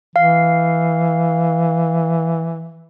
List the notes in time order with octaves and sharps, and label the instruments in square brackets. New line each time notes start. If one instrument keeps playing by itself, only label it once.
[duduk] E3 [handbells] F5